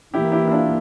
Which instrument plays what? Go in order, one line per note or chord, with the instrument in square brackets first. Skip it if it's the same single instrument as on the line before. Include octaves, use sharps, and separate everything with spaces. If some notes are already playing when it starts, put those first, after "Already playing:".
[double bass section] E3 A#3 [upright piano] E4 G4
[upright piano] E4 G4
E4
D4 F4